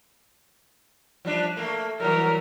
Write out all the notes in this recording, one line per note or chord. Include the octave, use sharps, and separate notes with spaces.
F3 G3 D4
A3 A#3
E3 F#3 G3 A#4